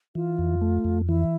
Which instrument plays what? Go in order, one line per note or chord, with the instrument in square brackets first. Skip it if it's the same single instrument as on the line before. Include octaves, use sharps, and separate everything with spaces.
[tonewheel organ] E3 [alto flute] F4
[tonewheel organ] F2
A3
F2
[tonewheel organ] E3 [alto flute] E4